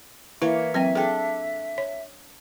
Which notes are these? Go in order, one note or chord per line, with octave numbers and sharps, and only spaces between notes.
E3 A#3 E4 C#5 E5
F#3 C4 G5 G#5
D4 G#4 A4 G5
C#5